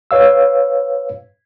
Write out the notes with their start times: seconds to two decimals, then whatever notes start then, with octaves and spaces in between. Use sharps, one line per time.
0.11 B4 C#5 F5 E6